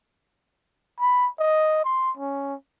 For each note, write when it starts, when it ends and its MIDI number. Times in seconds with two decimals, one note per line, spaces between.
1.00 1.28 83
1.39 1.83 75
1.85 2.11 84
2.17 2.54 61